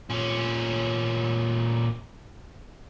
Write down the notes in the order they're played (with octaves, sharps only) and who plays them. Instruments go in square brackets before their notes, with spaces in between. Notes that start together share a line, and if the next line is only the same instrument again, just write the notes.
[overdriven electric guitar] A#2 C#4